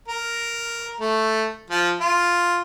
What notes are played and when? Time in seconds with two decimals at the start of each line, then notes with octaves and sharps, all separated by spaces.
0.08 A#4
1.00 A3
1.70 F3
2.01 F4